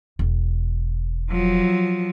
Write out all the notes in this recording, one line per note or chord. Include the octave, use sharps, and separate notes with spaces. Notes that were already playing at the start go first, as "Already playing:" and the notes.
E1
F3 F#3